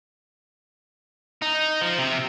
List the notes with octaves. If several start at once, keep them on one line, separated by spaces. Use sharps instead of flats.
D#4
F3
C3